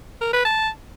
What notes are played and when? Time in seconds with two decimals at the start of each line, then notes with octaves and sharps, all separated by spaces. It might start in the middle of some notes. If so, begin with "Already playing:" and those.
0.21 A#4
0.33 B4
0.45 A5